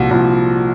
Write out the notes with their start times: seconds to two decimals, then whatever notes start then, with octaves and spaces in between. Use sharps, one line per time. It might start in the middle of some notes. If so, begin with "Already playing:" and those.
Already playing: C2 A#2 F3 F#4
0.11 C2 A#2 F3